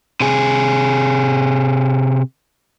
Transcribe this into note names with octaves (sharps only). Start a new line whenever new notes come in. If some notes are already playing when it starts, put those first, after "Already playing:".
C3 G#4